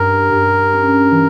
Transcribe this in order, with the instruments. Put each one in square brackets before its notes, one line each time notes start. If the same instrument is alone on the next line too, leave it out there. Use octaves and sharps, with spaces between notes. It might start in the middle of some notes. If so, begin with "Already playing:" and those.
Already playing: [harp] G2 [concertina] A#4
[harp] G2
C#4
E3